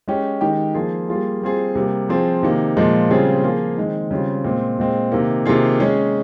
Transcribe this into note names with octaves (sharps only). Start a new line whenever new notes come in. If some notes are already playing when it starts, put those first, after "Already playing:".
G#3 C#4 G4
D#3 G#3 D#4 G4
F3 A#3 F4 G#4
G3 A#3 F4 G#4
G3 C4 F4 G#4
C3 G3 A#3
F3 C4 F4 G#4
C3 D#3 A#3
A#2 F3 G#3
C#3 G3 C4 F4 G#4
F3 A#3 F4 G#4
D#3 G#3 C4
C#3 G3 C4 F4
A#2 G#3 C4
A#2 G#3 C4
C3 D#3 A#3
C3 D#3 A#3 F4 G#4
G#3 C#4 G#4